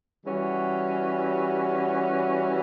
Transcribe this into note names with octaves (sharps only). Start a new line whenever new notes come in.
E3 G3 C#4 F#4